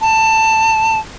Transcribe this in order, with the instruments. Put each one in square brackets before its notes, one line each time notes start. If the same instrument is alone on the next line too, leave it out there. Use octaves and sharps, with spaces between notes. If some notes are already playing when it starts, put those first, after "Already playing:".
[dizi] A5